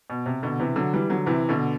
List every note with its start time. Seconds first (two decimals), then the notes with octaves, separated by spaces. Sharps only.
0.10 B2
0.26 C3
0.43 B2 D3
0.60 C3 E3
0.76 D3 F#3
0.93 E3 G3
1.09 D3 F#3
1.26 C3 E3
1.49 B2 D3